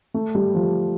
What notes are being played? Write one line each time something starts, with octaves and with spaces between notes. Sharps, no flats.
A3
G3
F3